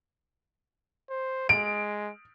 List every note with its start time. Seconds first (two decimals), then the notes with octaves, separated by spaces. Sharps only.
1.10 C5
1.49 G#3 D7